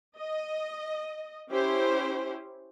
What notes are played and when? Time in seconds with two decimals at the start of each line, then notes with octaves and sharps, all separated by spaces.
0.19 D#5
1.51 C#4 E4 G4 C5